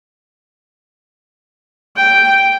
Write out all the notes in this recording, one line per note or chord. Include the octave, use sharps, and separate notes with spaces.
G5